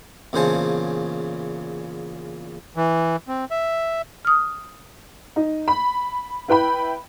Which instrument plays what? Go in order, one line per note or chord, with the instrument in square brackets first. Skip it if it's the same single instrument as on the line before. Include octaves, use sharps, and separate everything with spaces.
[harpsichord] E2 A#2 C#3 C5 G#5 A5
[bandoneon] E3
C4
E5
[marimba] D#6 F6
[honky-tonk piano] D#4
B5
E4 B4 G5 B5